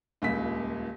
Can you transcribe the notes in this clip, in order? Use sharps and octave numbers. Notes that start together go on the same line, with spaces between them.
D#1 C#2 A#2 B6